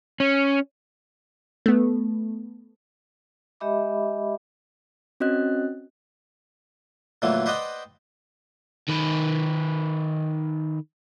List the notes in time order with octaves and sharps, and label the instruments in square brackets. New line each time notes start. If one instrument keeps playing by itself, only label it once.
[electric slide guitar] C#4
[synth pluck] A3 B3
[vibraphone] G#3 G4 D#5 E5 B5 D6
[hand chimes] C4 C#4 F#4 D#5 F#6
[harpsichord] A#2 D3 E3 F#3 A3
B4 C5 D5 D#5 F#5 G5
[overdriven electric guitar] D#3 B4